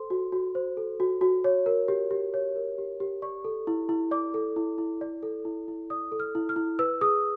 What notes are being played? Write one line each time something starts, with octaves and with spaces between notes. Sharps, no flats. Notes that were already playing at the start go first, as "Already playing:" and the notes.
Already playing: A4 C5 C6
F#4
F#4
C5
A4
F#4
F#4
C#5
A#4
G4
G4
C#5
A#4
G4
G4
D5 C#6
A4
E4
E4
D5 D6
A4
E4
E4
D5
A4
E4
E4
D5 D#6
A4
F6
E4
F6
E4
B4 E6
G#4 D#6